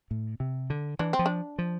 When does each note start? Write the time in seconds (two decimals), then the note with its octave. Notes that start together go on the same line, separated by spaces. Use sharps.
0.11 A2
0.40 C3
0.70 D3
0.99 E3 D4
1.13 C4
1.19 F3
1.26 D4
1.59 F3